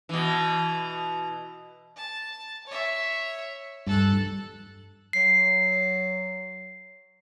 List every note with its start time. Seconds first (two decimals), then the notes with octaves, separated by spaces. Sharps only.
0.09 B2 E3
1.96 A5
2.67 C#5 E5
3.87 G2 A4 F#6
5.13 F#3 C7